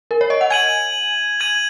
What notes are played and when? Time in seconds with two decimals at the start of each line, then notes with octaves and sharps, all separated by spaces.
0.11 A#4
0.21 C#5
0.30 D#5
0.41 F#5
0.50 G#5 G#6 D#7 F#7
1.40 G#6 D#7 F#7